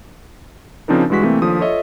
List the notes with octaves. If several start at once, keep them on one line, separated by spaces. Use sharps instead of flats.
C#3 F3 C4 D4 D#4 A#4
G2 E3 G#3 F#4 B6
C3 E3 A3 A#3 C4
D#2 F3 D4 A4 D#6
F4 A4 C#5 D#5 E5